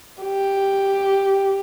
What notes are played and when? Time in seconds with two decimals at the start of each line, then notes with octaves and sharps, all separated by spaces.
0.23 G4